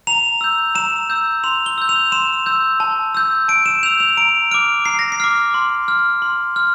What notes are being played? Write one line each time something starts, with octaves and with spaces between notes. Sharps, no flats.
A#5 F7
E6 G6
A#5 E7
E6 G6
C6 F7
G7
E6 G6
F7
C6 E7
E6 G6
A5
E6 G6
A5 D7
E7
E6 G6 F7
F7
A#5 D7
D6 F6 D7
A#5 C7
A#6
C7
D6 F6
C6
F6
C6
F6